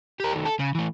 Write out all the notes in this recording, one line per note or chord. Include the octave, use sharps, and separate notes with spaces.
G4 A#4
D#3 A3
A4
C#3
E3 A3